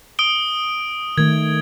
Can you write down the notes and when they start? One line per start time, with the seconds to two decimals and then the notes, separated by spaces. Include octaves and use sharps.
0.19 D#6 D7 G7
1.18 D#3 A3 G#6